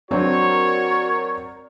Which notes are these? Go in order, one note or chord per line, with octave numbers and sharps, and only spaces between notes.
F#3 C4 D4 F#4 A#4 C#5 D5 A#5